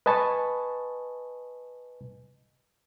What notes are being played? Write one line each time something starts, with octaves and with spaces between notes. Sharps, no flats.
B4 D#5 G#5 A5 B5 C#6